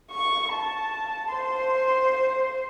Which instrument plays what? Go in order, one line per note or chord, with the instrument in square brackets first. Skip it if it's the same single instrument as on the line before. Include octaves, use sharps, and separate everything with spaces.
[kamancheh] C#6
A5
C5 C6